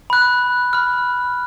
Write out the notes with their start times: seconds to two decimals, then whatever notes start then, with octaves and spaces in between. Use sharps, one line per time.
0.10 B5 F#6
0.73 B5 F6